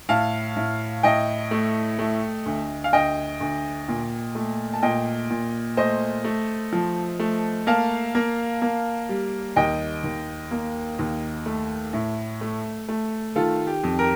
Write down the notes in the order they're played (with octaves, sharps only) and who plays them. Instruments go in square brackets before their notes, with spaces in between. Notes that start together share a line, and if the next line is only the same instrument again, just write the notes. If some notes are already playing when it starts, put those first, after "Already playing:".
[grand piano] A2 F5 A5
A2
A2 D#5 G5
A3
A3
D2
F5
D2 D#5 G5
D2
A#2
A3
A5
A#2 D#5 G5
A#2
A3 C5 D#5
A3
F3
A3
A#3 F5 A5
A#3
A#3
G3
D#2 D#5 G5
D#2
A#3
D#2
A3
A2
A3
A3
D#3 F4 A4
G4
F2
G4 A#4